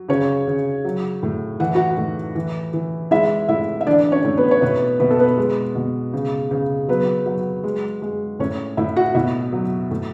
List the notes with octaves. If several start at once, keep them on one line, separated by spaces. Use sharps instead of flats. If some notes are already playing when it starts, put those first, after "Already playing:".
Already playing: F#3
C#3 C#4 C#5
C#3
F#3
A2
E3 F#5
F#4 F#5
A2
E3
E3
G#3 E4 E5
A2 E4 E5
E5
E3 D4 D5
C#4 C#5
A2
B3 B4
C#5
B2 B3 B4
B2 B4
A4
B3 B4
G#3
B2
C#3
C#3
F#3 B3 B4
F#3
G#3
G#3
A2 C#4 C#5
A2 E4 E5
F#4 F#5
B2 E4 E5
F#3
A2